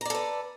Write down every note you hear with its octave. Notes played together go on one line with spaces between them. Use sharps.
A4 B4 D5 A#5